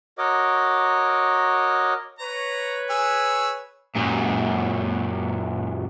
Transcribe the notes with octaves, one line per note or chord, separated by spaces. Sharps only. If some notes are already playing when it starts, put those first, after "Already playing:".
F#4 A#4 C#5 D#5 D6
B4 C#5 A#5
G#4 E6
F#2 A#2